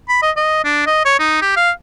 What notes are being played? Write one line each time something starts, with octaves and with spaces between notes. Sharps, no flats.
B5
D#5
D#5
D4
D#5
C#5
D#4
G4
F5